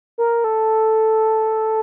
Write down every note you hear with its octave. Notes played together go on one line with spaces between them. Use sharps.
A#4
A4